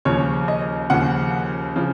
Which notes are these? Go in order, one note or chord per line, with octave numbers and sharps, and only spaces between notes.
D#2 C#3 F3 C#5
D#5
D#2 C#3 F3 F#5
C#3 F3